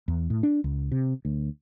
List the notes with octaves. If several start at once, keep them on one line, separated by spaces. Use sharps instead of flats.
E2
A2
D4
C#2
C3
D2